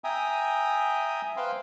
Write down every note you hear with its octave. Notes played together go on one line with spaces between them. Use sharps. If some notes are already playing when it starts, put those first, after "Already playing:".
E5 G5 G#5 A#5 D#6
B4 C5 F5 G5 C6